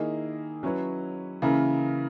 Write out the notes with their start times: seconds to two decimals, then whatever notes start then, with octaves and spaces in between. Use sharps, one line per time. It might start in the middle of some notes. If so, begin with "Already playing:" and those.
Already playing: D#3 A#3 E4 G#4 D#5
0.63 F#3 C#4 E4 B4
1.42 C#3 E3 A#3 E4 A#4